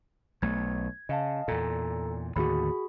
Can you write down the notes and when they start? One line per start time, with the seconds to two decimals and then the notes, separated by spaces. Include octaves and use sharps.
0.42 B1 A3 G#6
1.09 C#3 D#5 F5 A5
1.48 E2 A#2 A4 A#5
2.36 D#2 A2 D3 F#4 G#4 B5